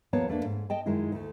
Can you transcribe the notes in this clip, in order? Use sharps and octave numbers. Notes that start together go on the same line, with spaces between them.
D#2 F3 A#3 B3 C#5 A5
E2 A3 A#3 D4
G#2
D#5 G5 A5
F#2 D#3 G#3 D#4 E4
D2 A3